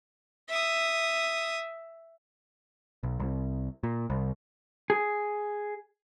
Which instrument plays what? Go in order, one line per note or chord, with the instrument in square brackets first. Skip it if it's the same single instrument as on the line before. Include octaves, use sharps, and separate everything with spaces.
[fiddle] E5 D#6
[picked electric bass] B1
C2
A#2
C2
[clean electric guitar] G#4